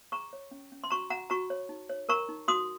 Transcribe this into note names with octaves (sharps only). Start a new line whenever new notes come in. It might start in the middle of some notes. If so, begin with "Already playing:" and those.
G#4 A#5 C#6
C#5
C#4
C#4
C6
F#4 A#5 C#6
F#4 F#5 A#5
F#4 A#5 C#6
C#5
D#4
C#5
A#4 A#5 C#6
D#4
F#4 C6 D#6